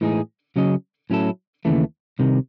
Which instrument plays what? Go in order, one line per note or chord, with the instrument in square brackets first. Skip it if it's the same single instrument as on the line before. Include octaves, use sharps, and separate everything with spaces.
[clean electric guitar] A2 E3 G#3 D#4 G#4
C#3 F#3 C#4 G#4 D#5
A2 F#3 C#4 E4 A4
D#2 C#3 E3 A3
C2 C3 D#3